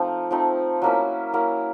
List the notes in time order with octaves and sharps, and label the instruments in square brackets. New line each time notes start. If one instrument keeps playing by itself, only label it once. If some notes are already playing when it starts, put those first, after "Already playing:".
Already playing: [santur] F3 A3 C4 D#4
F3 A3 C4 D#4
F#3 A#3 C#4 E4
F#3 A#3 C#4 E4